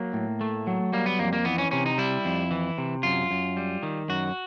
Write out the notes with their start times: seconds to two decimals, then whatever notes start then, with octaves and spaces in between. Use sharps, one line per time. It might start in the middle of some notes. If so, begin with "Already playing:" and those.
Already playing: F#3 A#3
0.13 A2
0.41 A3
0.67 F#3
0.93 G3 A#3
1.06 B3
1.19 F2 A#3
1.33 A#3
1.45 E3 B3
1.58 C#4
1.71 C3 C#4
1.86 D#4
1.98 G3 E4
2.25 F2
2.51 E3
2.78 C3
3.03 F#2 F4
3.31 F#2
3.57 G3
3.83 D#3
4.09 F#2 F#4